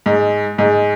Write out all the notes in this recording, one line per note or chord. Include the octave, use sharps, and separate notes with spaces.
G#2
G#2